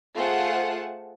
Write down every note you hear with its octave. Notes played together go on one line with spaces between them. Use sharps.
A3 F4 G#4 C5 F#5 A5